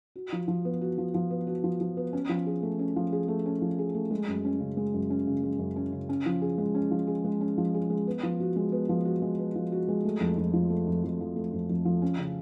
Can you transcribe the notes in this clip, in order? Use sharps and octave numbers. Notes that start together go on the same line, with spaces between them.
F#4
F3
F3
B3
F#4
F3
F3
B3
F#4
F3
F3
B3
C#4
F3
G#4
A3
C#4
F3
G#4
A3
C#4
F3
G#4
A3
G#3
F#2
C#4
C#3
G#3
F#2
C#4
C#3
G#3
F#2
C#4
C#3
C#4
F3
G#4
G#3
C#4
F3
G#4
G#3
C#4
F3
G#4
G#3
B3
F3
F#4
G#3
B3
F3
F#4
G#3
B3
F3
F#4
G#3
A3
F2
F2
F3
A3
F2
F2
F3
A3
F2
F2
F3
C#4
C#3